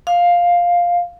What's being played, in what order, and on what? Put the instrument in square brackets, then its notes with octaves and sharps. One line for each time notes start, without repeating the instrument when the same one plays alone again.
[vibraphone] F5